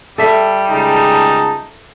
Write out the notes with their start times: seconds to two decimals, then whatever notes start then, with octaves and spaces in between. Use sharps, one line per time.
0.18 G3 A4 E5
0.70 C#2 D#4 G#4 A5